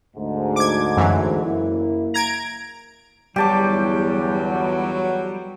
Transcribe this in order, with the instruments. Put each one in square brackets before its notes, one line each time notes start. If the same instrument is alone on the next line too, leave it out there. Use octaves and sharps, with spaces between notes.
[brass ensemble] D2 G#2
[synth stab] D6 G#6
F#2 E3
[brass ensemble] F#1 A#3 E4
[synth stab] A#5 G#6 D7
[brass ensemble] G1 E2 [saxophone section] F#3 [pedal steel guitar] G3 [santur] G4 A5 D6